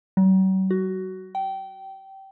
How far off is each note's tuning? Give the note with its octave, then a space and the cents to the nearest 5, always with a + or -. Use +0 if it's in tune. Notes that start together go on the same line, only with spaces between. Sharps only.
F#3 +45
F#4 +15
G5 -20